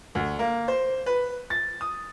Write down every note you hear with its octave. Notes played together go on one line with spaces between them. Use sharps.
D2
A#3
C5
B4
A6
D#6